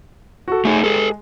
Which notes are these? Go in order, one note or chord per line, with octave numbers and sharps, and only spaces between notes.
F#4 A4
A3 D#4 G#4
G#3 G4 A4